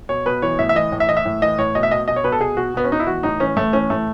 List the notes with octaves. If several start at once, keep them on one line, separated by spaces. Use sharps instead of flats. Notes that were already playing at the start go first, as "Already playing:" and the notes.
B2 C#5
B2 B4
E3 C#5
A2 E5
E5
E3 D#5
A2
E5
E3 D#5
E5
A2
E3 D#5
A2 C#5
B2 D#5
E5
B2 D#5
B2 D#5
C#5
B2 B4
A4
B2 G#4
B2 F#4
B2 B3
C#4
B2 D#4
E4
E3 F#4
A2 D#4
E3 C#4
A2 A3
E3 C#4
A2 A3